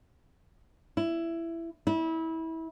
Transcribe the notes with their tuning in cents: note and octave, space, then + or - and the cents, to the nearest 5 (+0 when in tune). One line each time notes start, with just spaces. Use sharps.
E4 +15
E4 -25